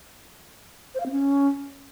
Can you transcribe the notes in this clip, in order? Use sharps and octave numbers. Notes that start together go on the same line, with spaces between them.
C5
F5
C4
C#4